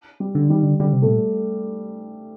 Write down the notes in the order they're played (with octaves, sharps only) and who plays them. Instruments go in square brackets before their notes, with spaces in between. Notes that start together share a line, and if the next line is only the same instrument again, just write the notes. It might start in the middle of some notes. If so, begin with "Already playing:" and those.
[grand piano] G3
[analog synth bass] D3
[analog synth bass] D#3 [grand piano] G3
[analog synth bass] D3
[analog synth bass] D3 [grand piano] G3
[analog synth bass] C3
[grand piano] A3
[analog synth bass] A#2